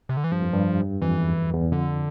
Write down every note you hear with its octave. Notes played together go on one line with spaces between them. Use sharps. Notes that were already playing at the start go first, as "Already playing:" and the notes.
C3
D3
E3
G2 F3
F2
G2
F2 E3
E2
E2
F2 D3